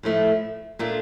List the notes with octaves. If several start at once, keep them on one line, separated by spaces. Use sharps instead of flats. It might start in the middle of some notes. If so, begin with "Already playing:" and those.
A2 F3 A3 E4
A#2 A3 D4 F4